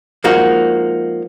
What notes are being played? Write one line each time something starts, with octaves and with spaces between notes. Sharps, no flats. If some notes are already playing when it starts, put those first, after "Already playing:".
F3 G#3 A#3 D#4 F#4